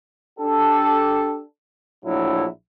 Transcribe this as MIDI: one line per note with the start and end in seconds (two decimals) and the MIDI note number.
0.39 1.41 62
0.39 1.41 67
0.39 1.41 69
2.05 2.46 34
2.05 2.46 45
2.05 2.46 54
2.05 2.46 62
2.05 2.46 64